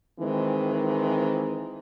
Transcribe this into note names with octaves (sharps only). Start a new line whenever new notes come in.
D#3 E3 G#3 C4